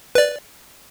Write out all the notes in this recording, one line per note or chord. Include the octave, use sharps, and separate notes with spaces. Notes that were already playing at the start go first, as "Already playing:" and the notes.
B4 D5